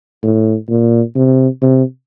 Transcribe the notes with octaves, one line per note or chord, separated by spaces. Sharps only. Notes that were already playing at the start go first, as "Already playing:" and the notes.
A2
A#2
C3
C3